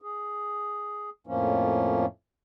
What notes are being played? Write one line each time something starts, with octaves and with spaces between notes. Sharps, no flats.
G#4
F2 A2 F3 A#3 C#4